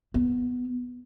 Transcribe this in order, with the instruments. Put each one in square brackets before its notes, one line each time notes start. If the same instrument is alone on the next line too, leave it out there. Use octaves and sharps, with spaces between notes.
[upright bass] B3